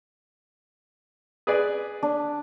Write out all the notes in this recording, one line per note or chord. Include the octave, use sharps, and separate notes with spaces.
G#4 B4 D5
D4